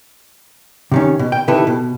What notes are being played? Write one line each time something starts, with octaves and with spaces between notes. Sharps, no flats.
C3 D#3 C#4
B2
G5
C3 D#3 E4 A4 B4
B2